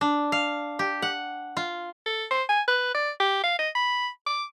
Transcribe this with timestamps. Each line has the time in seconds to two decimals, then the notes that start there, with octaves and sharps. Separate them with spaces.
0.01 D4
0.32 F5
0.79 G4
1.02 F#5
1.57 F4
2.06 A4
2.31 C5
2.49 G#5
2.68 B4
2.94 D5
3.20 G4
3.43 F5
3.59 D#5
3.75 B5
4.26 D6